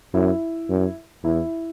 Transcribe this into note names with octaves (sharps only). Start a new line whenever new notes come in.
F#2 E4
F#2
E2 E4